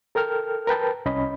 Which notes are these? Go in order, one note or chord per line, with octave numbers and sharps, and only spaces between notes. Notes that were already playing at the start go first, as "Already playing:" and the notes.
A4 A#4 G5 F6
A#4 B4 G5 A5
C2 C#4 D#5 B5